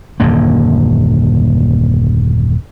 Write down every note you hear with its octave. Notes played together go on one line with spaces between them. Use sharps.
D#1 F#2 D3 A#3